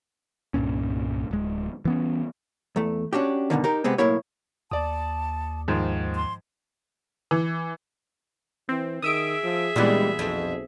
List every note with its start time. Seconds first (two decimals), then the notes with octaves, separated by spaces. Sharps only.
0.54 C2 G2 A#2 C#4
1.31 D1 G#3
1.85 E3 B3 C#4
2.76 E2 A3
3.13 C#4 D4 F#4 G4
3.50 G2 B2 D3 D#3
3.64 D#4 G4 A#4
3.84 C3 G#3 B3 C4
3.98 B1 A2 A#3 E4 C#5
4.71 D#2 D5 A5 D#6
5.68 G#2 D#3 F3
6.16 C6
7.31 E3
8.69 E3 C4
9.02 D#3 G#4 E5 D#6 E6 D7
9.44 F3
9.76 A#2 E3 G3 G#3 A#3 B3 D4
10.19 B1 F2